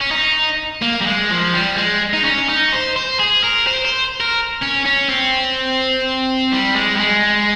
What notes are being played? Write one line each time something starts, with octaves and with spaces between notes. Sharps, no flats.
C#4
D#4
A#3
G3
G#3
F3
G3
G#3
D#4
C#4
D#4
C5
C5
G#4
A#4
C5
C5
A#4
C#4
C#4
C4
G3
G#3
G3
G#3